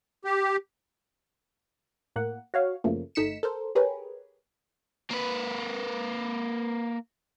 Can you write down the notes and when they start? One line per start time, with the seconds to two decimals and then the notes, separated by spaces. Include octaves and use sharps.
0.25 G4
2.16 A2 A#3 F#5
2.54 F#4 C#5 F5
2.84 F#2 C#3 F3 A3 A#3
3.15 G1 A3 D#4 B6 C#7 E7
3.43 A4 A#4 C5
3.75 G4 G#4 A#4 B4 C#5
5.10 A#3 B4